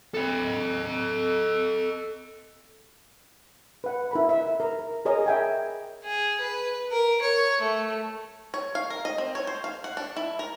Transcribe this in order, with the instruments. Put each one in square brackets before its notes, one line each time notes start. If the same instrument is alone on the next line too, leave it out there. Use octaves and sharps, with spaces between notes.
[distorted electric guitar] A4 D#5
[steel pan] B4 F#5
E4 A#4 B5
E5
A#4
G#4 A#4 C#5 D#5
E5 G5 G#5
[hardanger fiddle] G#4
B4
A#4
C#5
A3
[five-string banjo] C#5
F5
A#4
D#5
C4
C#5
C5
F5
F#5
D4
E4
A#4